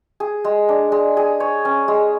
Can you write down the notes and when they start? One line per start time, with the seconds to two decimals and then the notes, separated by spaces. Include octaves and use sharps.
0.20 G#4
0.45 G#3
0.69 D4
0.92 G#3
1.17 G#4
1.40 C#5
1.65 C#4
1.88 G#3